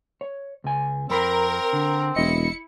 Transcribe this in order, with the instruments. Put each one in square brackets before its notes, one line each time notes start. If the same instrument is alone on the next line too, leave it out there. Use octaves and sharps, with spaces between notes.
[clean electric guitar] C#5
C#2 G#5
[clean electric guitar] F2 B5 [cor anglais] C4 [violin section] A#4
[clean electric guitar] D3
[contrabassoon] E1 [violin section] E4 C#7 [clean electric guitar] D#5